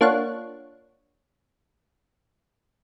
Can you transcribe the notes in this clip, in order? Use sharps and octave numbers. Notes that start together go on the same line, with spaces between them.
A#3 D4 F4 C#5 F#5